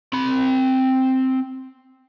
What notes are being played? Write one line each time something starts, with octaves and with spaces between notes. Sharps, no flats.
C4 B5